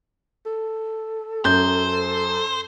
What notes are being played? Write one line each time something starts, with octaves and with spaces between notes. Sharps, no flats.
A4
F#2 C5 G6